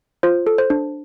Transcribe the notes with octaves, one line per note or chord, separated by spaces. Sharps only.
F4 C5
A4
C5
D4